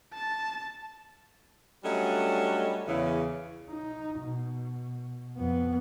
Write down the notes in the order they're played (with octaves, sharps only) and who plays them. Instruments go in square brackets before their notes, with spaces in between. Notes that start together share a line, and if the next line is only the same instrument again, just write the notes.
[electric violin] A5
[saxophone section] F#3 G3 A3 C#4 D4 D#5
E2 C#3 E3
[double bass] D#4
B2
F2 B3